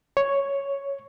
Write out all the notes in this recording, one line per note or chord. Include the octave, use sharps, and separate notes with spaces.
C#5